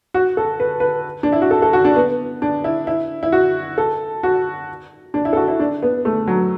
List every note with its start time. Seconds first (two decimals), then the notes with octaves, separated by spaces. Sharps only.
0.14 F#4
0.37 A4
0.60 B4
0.80 B4
1.23 D4
1.32 E4
1.42 F#4
1.51 A4
1.62 A4
1.73 F#4
1.84 D4
1.96 B3
2.42 D4
2.64 E4
2.87 E4
3.23 E4
3.32 F#4
3.78 A4
4.23 F#4
5.14 D4
5.25 E4
5.33 A4
5.37 F#4
5.48 E4
5.60 D4
5.82 B3
6.05 A3
6.27 F#3